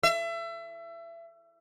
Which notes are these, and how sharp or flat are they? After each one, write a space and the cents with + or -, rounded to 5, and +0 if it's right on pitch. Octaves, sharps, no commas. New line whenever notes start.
E5 +30